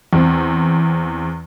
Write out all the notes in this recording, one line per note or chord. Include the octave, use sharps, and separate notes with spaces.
E2 C4